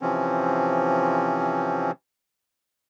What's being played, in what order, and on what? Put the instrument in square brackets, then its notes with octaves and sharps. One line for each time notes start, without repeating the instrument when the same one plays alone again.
[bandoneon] C3 E3 F3 C4 C#4